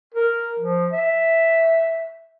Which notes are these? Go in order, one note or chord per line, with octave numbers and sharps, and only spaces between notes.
A#4
F3
E5